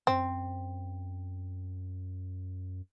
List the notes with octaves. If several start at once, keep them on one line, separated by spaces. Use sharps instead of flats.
F#2 C4